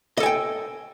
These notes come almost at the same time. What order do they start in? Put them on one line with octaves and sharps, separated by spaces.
D#5 A4 G#5 G5